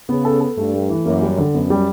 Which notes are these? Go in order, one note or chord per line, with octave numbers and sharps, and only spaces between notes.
C#3 B3
A4
A4
G2 A3
A3
E3
F#2 A#3
G3
D3
F#2 B3
G3